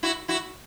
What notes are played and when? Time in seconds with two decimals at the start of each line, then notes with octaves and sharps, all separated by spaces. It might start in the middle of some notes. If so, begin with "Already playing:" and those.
0.03 E4 F#4
0.28 E4 F#4